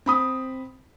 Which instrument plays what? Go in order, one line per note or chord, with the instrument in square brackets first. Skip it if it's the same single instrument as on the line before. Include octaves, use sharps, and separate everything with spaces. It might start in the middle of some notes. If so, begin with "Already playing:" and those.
[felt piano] C4 B5 D#6